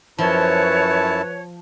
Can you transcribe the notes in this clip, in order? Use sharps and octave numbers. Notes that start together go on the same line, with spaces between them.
F#2 F3 E4 B4 C#5 A5